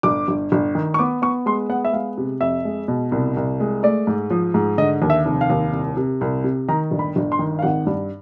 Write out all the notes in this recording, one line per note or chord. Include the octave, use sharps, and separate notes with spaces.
G1 D6
G1
G1
D#3
C#6
B3 D6
B3 C#6
G#3 C6
B3 F#5
E5
G#3 F5
C3
F2 E5
G#3
B2
C2
C2
G#3
A3 D5
G#2
F3
G#2
D3 D#5
D#2
E5
F1
F5
D#2
C2
C3
C2
C3
D#3 A#5
G1
B5
G1
C6
D#3
F5
G#1 F#5
G2